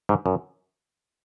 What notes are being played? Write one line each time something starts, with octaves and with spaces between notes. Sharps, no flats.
G#2
F#2